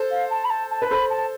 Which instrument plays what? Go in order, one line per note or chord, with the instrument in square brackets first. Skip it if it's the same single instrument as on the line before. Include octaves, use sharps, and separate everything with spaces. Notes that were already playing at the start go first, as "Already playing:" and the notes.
Already playing: [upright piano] A4 C5
[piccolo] F5
A5
B5
A5
A5
[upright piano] B4
[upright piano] A4 C5 [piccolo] B5
[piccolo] A5